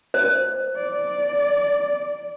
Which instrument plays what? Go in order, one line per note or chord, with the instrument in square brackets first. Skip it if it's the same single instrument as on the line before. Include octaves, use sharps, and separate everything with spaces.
[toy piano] C5
[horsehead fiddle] D5